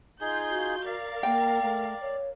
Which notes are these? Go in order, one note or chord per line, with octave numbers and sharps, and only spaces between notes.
D#4 F4 G#4 G6
F#4
A#4 D5 F5
A#3 G5
A3
C#5